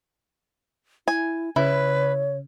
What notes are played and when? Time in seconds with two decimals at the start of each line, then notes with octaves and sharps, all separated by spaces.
1.08 E4 G#5
1.56 C#3 E4 B4 C#5